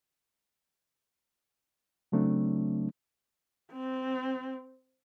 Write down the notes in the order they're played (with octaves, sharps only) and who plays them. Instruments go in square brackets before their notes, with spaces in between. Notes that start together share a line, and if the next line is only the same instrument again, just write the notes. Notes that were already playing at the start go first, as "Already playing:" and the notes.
[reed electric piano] C#3 F#3 A3 C4 D4
[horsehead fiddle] C4